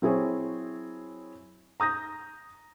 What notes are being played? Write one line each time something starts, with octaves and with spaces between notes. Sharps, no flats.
F#3 C4 E4 G#4 C#5
A#5 D#6 G6 A#6